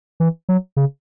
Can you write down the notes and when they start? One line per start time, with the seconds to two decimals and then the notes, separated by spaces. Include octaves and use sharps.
0.20 E3
0.49 F#3
0.77 C#3